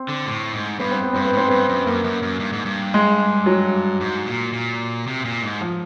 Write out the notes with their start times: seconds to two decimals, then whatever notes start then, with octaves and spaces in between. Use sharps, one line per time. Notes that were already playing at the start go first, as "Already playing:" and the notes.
Already playing: C4
0.09 D3
0.26 A2
0.53 G#2
0.79 G2 B3
0.91 C4
1.03 B3
1.13 G2 C4
1.25 B3
1.33 G#2 C4
1.48 G2 B3
1.69 F#2
1.86 F#2 A#3
2.04 F#2
2.22 F#2
2.40 G2
2.53 G#2
2.65 G2
2.94 G#3
3.46 F#3
4.01 G#2
4.26 A#2
4.53 A#2
5.07 C3
5.25 A#2
5.43 G#2
5.61 F3